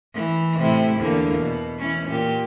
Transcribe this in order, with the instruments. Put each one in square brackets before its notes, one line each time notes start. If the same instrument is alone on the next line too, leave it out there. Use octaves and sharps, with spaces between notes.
[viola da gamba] E3
A2 C3 E4
E2 D3 A#3
B2
E3 C#4
A#2 G4